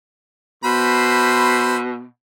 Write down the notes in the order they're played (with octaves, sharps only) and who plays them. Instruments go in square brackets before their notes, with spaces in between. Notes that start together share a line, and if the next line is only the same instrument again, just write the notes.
[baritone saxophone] B2 [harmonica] C5 B5